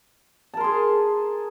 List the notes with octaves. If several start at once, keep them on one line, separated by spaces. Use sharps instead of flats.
G#4 A#4 A5 C6